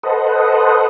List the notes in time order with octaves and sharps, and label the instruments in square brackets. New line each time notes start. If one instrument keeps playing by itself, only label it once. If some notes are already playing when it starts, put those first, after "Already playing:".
[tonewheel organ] A4 B4 C5 D#5 F#5